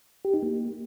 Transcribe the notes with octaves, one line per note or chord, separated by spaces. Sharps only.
G4
D#4
A#3